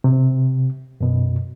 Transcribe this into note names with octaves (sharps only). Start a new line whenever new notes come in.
C3
F#2 B2